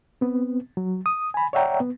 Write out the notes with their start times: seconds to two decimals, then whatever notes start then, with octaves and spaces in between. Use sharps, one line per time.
0.21 B3 C4
0.77 F#3
1.06 D#6
1.34 G#5 B5
1.53 C#5 D5 E5 F#5 G5 A#5
1.80 B3